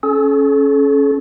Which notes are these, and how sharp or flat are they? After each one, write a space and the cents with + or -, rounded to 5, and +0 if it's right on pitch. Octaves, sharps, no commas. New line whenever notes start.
C#4 +0 A4 -40